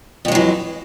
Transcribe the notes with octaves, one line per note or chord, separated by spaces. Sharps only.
F2 E3 F#3 G#3